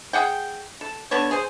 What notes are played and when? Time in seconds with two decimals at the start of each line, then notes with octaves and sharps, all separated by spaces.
0.13 G#4 F#5 G5
0.81 A4
1.11 D3 B3 A4 C#5
1.31 G#4 C5